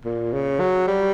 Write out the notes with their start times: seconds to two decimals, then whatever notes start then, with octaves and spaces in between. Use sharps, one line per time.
0.05 A#2
0.33 C#3
0.60 F#3
0.87 G3